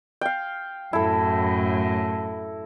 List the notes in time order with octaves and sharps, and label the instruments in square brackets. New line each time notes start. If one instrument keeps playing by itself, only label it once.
[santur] F5 G5
[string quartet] F#2 A2 [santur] E4 A4